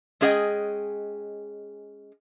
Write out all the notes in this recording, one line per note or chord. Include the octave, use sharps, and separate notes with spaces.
G#3 C#4 G#4 D#5 F5 G5